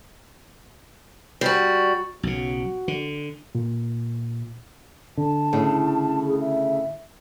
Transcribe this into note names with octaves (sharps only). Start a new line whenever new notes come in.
G3 F#4
B1 C#3 F#4
D3
A#2
D3 A5
A2 C#3
G#4
E5